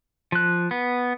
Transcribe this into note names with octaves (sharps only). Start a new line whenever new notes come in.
F3 F#6
B3